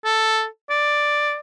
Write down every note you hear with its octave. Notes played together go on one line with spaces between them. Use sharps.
A4
D5